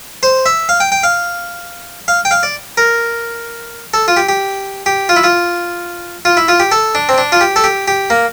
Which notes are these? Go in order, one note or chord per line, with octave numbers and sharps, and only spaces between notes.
C5
E5
F5
G5
G5
F5
F5
G5
F5
D5
A#4
A4
F4
G4
G4
G4
F4
E4
F4
F4
E4
F4
G4
A4
D4
C4
D4
F4
G4
A4
G4
G4
A#3